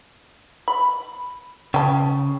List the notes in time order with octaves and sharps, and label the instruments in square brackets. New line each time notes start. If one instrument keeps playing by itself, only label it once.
[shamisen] B5
[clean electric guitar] C#3 [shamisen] G5 A5